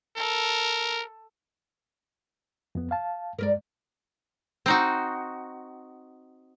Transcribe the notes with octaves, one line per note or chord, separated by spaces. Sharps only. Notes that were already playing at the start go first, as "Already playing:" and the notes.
A4 A#4
F2 B3
F5 A5
G2 G#3 A#4 B4 D5
C4 D#4 F#4